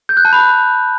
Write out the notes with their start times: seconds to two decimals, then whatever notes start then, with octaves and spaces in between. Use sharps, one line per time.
0.09 G6
0.17 F#6
0.25 A5
0.33 B5
0.40 F#6